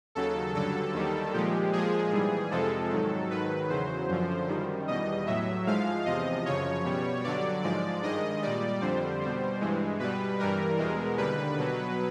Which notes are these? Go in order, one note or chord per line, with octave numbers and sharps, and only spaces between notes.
D#2 C#3 F#3 A4
G2 D3 F#3 A4
D#2 D#3 G3
A#2 F3 G#3 G4
A#2 F3 G#3 G#4
G#2 E3 G3
F2 C3 F3 G#3 A4
G#2 D#3 F#3
G#2 D#3 F#3 B4
E2 C#3 F#3 C5
F#2 D3 F3
F#2 D#3 G3
E2 B2 G3 D#5
A2 F#3 E5
G#2 F3 G#3 F5
E2 C3 F3 D#5
F#2 C#3 F3 C#5
B2 G3
G2 D3 F#3 D5
G#2 F3 G#3 D5
G2 D#3 G#3 D#5
A#2 G3 D5
F2 D3 G3 C5
B2 G3
G2 E3 G#3
B2 G3 B4
G2 E3 G3 A#4
E2 B2 G#3
D#2 D3 G3 B4
B2 F#3